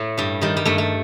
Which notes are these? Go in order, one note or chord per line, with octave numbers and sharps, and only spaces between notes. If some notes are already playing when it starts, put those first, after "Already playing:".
Already playing: A2 A3
G2 G3
D#3 G3
G3
G2 A3
A3